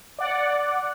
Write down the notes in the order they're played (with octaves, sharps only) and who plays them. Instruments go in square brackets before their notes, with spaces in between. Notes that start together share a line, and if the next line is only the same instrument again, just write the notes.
[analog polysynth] D5 F#5